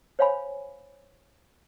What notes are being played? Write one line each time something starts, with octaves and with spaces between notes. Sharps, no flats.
C5 C#5 F5 G#5 B5